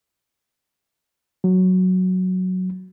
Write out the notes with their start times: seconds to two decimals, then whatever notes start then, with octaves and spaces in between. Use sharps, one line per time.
1.44 F#3